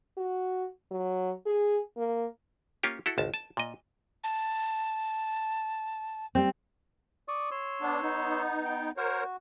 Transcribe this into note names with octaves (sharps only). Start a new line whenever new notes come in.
F#4
F#3
G#4
A#3
A#3 C#4 F4 G4
E4 F#4 A4
G#1 C#2 A5
A5
A#2 D#5
A5
G3 C4
D5 C#6 D#6
C#5 C6 E6
B3 D4
B3 D#4
G5
F#4 A#4 C5 C#5